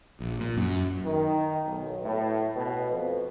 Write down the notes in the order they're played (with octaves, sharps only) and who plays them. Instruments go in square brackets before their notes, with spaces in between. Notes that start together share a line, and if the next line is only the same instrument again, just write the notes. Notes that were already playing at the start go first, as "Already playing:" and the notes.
[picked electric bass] A#1
A#2
F#2
[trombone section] D#3
B1
A2
B2
F2